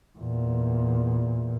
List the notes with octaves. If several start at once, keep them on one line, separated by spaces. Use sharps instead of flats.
E2 A#2